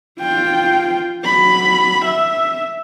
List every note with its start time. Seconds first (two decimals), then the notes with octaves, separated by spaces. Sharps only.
0.21 F4 G5
1.24 F#3 B5
2.05 E5